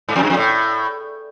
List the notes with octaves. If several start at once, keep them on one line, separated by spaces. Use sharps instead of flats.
G#2
F2
G2
F2
A2